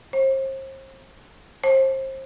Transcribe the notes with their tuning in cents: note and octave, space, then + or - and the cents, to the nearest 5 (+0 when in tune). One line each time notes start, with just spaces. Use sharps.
C5 +40
C5 +30